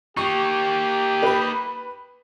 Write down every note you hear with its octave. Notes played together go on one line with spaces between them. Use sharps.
A#3 D#4 G4 C#6
B4 B5